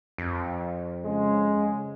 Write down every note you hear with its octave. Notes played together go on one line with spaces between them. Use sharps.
F2
C#3 G#3